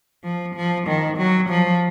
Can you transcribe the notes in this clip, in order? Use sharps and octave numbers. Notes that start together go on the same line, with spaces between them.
F3
F3
D#3
F#3
F3